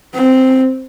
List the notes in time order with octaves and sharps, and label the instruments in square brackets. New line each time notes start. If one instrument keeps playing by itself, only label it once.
[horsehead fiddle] C4